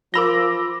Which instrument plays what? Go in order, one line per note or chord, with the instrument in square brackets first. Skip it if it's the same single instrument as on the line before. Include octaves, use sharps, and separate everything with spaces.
[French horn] F3 [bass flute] F4 [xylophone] A#4 B5 G7 [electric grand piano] D6 E6 A#6